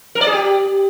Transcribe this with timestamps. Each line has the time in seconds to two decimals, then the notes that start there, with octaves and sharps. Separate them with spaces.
0.15 A#4
0.21 D5
0.27 G#4
0.32 G4